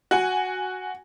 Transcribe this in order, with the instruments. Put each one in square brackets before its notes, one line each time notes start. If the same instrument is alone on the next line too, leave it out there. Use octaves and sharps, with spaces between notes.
[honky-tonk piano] F#4 G#5